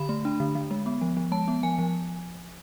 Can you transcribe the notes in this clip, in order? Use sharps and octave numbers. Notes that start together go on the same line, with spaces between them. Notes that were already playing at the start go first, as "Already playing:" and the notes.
Already playing: D3 B5
A3
D4
D3
D3
G#3
B3
F3
F3
G#3 A5
B3
F3 G#5
F3